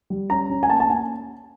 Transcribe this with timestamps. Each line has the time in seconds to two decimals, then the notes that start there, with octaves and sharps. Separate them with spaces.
0.10 G3
0.30 C#4 A#5
0.50 C#4
0.63 G#5
0.70 A#3 A5
0.80 A5
0.89 C#4 G#5